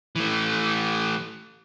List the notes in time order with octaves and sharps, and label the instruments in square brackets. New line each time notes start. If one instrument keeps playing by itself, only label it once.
[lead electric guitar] E3 A3